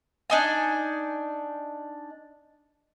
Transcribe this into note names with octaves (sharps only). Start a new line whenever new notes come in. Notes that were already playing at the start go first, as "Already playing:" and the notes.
D4 D#4 G#5